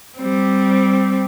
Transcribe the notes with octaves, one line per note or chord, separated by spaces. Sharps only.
G3 C4